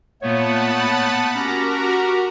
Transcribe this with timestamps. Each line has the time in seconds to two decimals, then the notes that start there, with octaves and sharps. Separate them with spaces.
0.22 A#2 A3 B3 C#5 F#5 A5 B5
1.35 C#4 F#4 G4 A#4 A#5